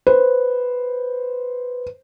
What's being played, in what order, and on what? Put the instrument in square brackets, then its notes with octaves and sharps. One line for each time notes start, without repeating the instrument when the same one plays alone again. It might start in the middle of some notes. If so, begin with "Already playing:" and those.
[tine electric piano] B4 [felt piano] C5